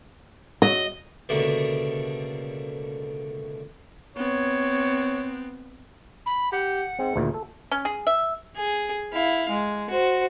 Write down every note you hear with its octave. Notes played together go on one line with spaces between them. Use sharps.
F#3 D#5
C#2 B2 D3 A3 A#3
B3 C4 C#5
B5
G4 F#5
G#2 C4
D2 A#2 D#3
A4
C#4
G#4
E5
G#4
E4 F5
G#3
F#4 C5